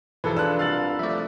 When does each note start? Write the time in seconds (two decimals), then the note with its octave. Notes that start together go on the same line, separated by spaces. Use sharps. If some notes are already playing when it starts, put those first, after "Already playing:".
0.24 E1 E3 F3 A4 B4
0.37 D4 F4 B4 E6 F#6
0.59 C2 F5 A6 F#7
0.99 F3 A3 D5 E5